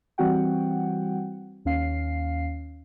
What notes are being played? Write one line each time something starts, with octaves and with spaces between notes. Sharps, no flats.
E3 G3 C4 F#4 F#5 G5
D#2 C#4 F5 C7